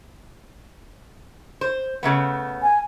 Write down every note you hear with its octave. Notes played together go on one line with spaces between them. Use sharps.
C5
C#3 A3 B3
G#5